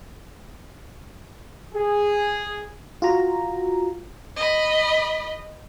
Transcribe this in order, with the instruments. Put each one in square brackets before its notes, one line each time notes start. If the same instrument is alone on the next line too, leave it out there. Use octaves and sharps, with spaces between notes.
[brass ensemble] G#4
[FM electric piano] F4 F#4 A#5
[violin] D#5 B5